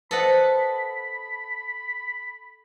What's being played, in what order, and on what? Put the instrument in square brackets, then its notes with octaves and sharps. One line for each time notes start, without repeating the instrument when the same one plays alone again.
[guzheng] A4 D#5 F#5 [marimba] B4 C5 [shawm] B5